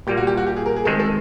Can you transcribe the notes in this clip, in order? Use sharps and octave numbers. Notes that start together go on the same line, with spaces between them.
A#2 G3 A#3 G4
F#4
G4
F#4
G4
G#4
A#4
G#4
D#3 G#3 C4 A4
A4